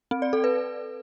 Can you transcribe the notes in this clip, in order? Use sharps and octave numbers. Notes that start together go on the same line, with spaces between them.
C4
D5
A4
B4